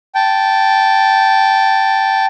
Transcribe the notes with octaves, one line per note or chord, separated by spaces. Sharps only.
G5 A5